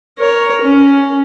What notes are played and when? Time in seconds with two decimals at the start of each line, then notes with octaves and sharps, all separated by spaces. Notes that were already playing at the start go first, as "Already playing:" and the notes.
0.18 A#4 C#5
0.61 C#4